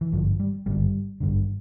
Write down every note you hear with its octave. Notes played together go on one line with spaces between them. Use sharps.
E3
G#1 G2 D3 F3
G3
G#1 G2 D3 G3
G#1 G2 D3